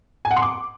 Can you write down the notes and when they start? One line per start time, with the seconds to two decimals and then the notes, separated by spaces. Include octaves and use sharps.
0.25 G#5
0.31 F#5
0.36 C6
0.42 D6